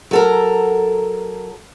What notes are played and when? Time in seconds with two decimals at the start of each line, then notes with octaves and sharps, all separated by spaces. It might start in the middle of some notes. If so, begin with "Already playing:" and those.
0.11 F#3 A4 A#4